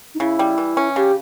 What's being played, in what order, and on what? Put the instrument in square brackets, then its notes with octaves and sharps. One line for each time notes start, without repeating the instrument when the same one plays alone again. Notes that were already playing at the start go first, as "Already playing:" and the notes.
[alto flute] D#4
[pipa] C#3 [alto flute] E4
[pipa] G3
E3
C#4
[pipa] C#3 [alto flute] G4